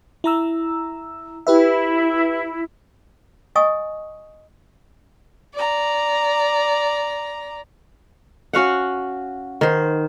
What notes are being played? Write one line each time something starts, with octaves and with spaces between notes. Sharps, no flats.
E4 A#5 E6
E4 G4 B4 E5
D#5 F5 G#5 C#6 D#6
D5 A#5
C#4 F#4 F5 F#5
D#3 C5